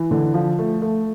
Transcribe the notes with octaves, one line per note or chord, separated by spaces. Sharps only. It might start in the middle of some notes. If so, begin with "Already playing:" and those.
Already playing: E3
D3
F3
A3
A3